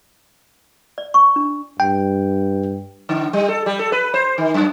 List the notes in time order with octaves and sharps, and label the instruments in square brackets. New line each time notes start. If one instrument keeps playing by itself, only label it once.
[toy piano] D5
C#6
D4
[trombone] G2 [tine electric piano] G5
[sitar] D3
G3
A4
G3
A4
B4
C5
D#3
F#2